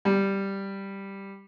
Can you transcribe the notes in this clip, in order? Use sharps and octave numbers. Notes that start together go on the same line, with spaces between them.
G3